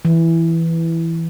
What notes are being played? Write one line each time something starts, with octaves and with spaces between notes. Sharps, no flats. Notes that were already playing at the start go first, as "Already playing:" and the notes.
E3